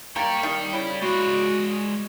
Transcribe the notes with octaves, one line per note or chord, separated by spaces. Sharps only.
A#3 A#4 D5 G5 C#6
D#3
C#3 E4
G#3 F#4 D5